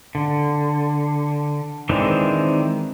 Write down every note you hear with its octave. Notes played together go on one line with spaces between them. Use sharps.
D3
D#3 E3 G#3 C4 D4